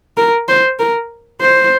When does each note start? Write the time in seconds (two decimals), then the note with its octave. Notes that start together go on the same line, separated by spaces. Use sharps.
0.17 A#4
0.48 C5
0.79 A#4
1.41 C5